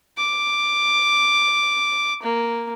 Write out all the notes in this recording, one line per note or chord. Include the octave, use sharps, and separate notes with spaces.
D6
A#3